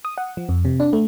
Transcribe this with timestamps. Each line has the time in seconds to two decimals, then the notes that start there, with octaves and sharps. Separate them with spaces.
0.05 D#6
0.18 F#5
0.37 F3
0.49 F2
0.65 C3
0.80 D4
0.93 A3